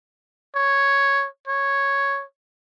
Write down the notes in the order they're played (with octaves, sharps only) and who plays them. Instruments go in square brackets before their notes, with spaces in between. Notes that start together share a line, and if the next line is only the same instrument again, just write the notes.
[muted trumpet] C#5
C#5